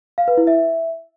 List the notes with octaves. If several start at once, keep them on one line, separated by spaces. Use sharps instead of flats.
F5
B4
E4
E5